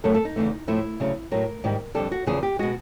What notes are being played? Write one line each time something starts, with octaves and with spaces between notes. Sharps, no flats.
F#2 C#3 F#3 A3 A4
A4
D#4
E2 C#3 E3 A3
A2 F3 A3 E4
D2 C#3 F#3 A3
A2 F#3 A3 A#4
G#2 D#3 G3
F2 D3 G3 A4
F#4
E2 C#3 F3 G#4
G4
B2 G#3 F#4